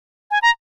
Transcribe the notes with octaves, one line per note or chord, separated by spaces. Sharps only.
G#5
A#5